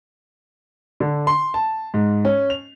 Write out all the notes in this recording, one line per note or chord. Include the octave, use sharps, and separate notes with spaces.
D3
C6
A5
G#2
C#4
F7